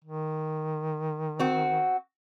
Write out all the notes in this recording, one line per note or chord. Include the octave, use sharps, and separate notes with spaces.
D#3
C4 F#4